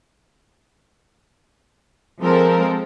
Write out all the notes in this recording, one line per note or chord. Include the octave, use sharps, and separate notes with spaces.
F3 G#3 C4 A4 A#4